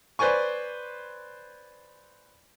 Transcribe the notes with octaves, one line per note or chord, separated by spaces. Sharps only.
B4 C5 D5 G#5 C#6